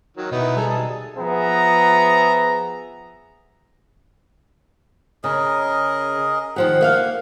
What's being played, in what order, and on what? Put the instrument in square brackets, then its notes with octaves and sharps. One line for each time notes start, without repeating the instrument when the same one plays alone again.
[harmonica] D#3 F#3
[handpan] B2 [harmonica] B3 D#4 E4
[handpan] G3 D#4 G#4 [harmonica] A4 G#5 A#5
[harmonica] A5 D#6
[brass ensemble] F3 B3 G#4 E5 A#5
[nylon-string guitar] C#3 [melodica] G#4 A#4 D#5
[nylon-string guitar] D#3 F3 G4 [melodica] F#5
[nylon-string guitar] A#3 E5 F5